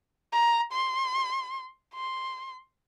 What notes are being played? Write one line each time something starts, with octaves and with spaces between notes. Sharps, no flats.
A#5
C6
C6